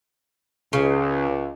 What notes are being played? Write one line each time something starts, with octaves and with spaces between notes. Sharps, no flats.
C#2 C#3